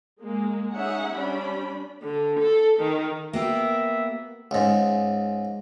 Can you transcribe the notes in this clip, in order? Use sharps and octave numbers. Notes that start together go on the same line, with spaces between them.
G#3 A#3
C#4 D#4 G#4 E5 F#5
G3 C#4 D4 B5
D3
A4
D#3
A#3 B3 G4 E5
C#2 G#2